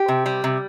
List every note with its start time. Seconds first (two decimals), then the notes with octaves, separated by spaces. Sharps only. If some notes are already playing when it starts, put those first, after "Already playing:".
Already playing: G4
0.08 C3
0.26 G3
0.44 C3